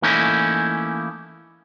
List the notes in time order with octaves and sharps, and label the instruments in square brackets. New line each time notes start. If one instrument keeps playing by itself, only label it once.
[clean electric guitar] E3 A3 A#3 C#4 D#4 E4